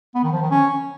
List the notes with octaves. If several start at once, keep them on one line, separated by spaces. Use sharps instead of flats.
B3
D#3
F3
D#3
C#4